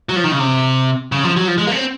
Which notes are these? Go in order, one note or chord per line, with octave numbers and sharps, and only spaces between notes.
F#3
F3
D#3
C#3
C3
C#3
F3
F#3
F3
G#3
A#3
C#4
C4